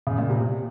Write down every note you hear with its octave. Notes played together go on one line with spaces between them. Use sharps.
C#3
A#2
C3